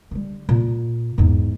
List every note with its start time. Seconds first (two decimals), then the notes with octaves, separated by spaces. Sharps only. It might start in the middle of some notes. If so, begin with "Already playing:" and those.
0.11 D3 G3
0.49 A#2
1.18 E2 G#2